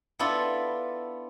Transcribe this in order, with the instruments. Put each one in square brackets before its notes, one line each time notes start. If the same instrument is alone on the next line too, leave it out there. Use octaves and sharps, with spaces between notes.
[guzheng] B3 D4 E4 F4 A4